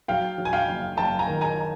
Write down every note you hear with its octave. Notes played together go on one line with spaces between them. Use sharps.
F#3 F5 G5
F#3
G#5
F5 G5
F#1
F#1 G5 A5
G#5 A#5
D#3
G#5 A#5